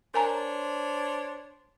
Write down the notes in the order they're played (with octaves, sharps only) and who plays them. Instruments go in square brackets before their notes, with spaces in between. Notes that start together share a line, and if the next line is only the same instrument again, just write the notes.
[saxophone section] D4 C5 C#5 [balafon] A#4 G#5 A#5